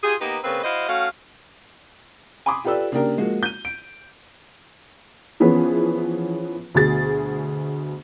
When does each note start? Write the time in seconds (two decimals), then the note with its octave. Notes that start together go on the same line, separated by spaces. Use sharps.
0.04 F4 G4 G#4
0.21 A#3 B3 D#4 G4 B4
0.44 C#3 A#3 C4 B4
0.64 E4 F#4 C5 D#5 F5
0.88 A3 C#4 F#4 F5
2.46 G#5 B5 C6 D6 D#6
2.64 F4 G4 A4 B4 D5 E6
2.92 C#3 A#3 D4 G4 A#4
3.17 F3 G#3 A#3 F#4
3.43 G6 D#7
3.65 D7
5.40 E3 F3 B3 C#4 G#4 B4
6.74 D2 B2 G#4 A6